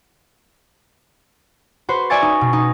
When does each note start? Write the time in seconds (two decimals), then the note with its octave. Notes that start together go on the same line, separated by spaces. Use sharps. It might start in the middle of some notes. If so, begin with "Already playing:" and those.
1.89 F#4 B4 C5 C6
2.10 D5 E5 G#5 C#6 A6
2.22 D#4
2.41 B2
2.53 D#4